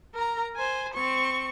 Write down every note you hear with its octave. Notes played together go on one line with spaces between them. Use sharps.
A#4 A#5
C5 G#5
C4 C#6